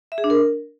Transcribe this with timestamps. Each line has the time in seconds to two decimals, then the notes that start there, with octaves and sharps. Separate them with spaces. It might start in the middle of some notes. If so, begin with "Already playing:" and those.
0.12 E5
0.18 G#4
0.24 D4
0.30 A#4